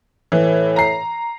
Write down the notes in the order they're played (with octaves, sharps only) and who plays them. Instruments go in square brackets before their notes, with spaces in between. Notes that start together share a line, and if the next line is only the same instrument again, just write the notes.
[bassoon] A2 [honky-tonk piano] E3
[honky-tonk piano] A#5 C7